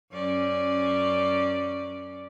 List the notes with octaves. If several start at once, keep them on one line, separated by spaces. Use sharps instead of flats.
F#2 C#4 D5